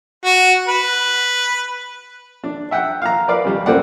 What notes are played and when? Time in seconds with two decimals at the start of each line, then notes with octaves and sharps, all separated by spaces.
0.25 F#4
0.68 B4
2.44 D4
2.71 E5 F#5 G5
3.02 F5 A#5
3.28 A#4 B4 D5 F5
3.44 C#2 G3
3.66 F#2 A#3 C4 D5 F#5